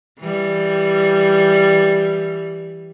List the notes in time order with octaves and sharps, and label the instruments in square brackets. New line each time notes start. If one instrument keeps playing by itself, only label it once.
[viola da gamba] E3 G3